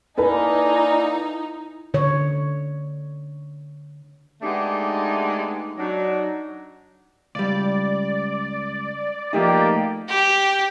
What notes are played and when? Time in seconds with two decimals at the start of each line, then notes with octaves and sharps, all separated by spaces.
0.18 A#3 D#4 E4 A4 B4 D5 G#5
1.94 D3 C#5
4.42 G#3 A3 B3 D4 D#4 G4
5.77 F#3 D4 D#4
7.35 C#2 G3 D5
9.33 F3 A3 A#3 D#4 G4
10.08 G4